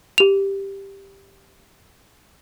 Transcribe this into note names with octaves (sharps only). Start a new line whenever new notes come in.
G4 F7